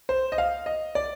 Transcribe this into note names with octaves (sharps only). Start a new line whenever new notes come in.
C5
D#5
F5
D#5
D5